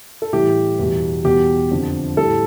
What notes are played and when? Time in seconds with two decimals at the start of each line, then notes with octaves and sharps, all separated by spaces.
0.22 A4
0.33 A2 E3 G3 G4
0.79 E2 B2 G3
1.25 E2 B2 G3 G4
1.71 F2 D3 F3
2.17 A2 G3 A4